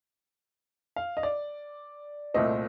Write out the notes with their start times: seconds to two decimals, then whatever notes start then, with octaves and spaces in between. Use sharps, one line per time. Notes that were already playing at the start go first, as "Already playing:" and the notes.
0.96 F5
1.17 D#5
1.23 D5
2.34 C2 A#2 A3 C4 D#5